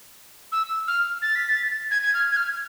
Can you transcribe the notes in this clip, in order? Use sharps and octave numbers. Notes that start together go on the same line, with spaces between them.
E6
F6
A6
B6
A6
G#6
G#6
F6
G#6
F6